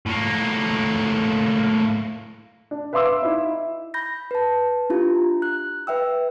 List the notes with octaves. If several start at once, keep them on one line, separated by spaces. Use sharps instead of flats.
A2 A#3
D4
B4 E5 F5 C6 D6 E6
D#4 E4
B5 G6 A#6
B4 A5
D4 E4 F4 G4
A#5
F#6
B4 E5 G5 E6